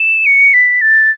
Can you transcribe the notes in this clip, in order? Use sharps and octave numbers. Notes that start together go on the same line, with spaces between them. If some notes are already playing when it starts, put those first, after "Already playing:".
Already playing: E7
C#7
B6
A6